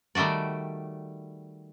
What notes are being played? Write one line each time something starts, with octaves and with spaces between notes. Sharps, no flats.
D#3 G3 A3 F#4 D5